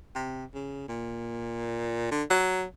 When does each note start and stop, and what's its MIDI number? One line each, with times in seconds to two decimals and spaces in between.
0.15 0.45 48
0.54 0.86 49
0.88 2.11 46
2.11 2.23 50
2.30 2.64 54